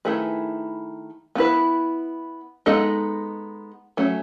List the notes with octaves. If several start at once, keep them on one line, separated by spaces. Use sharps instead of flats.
D#3 A3 E4 G#4 B4
B3 E4 B4
G#3 B3 D#4 A4 D#5
F#3 A3 C#4